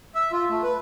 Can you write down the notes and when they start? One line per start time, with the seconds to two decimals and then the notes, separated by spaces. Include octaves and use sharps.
0.15 E5
0.32 F4
0.50 A3
0.63 B4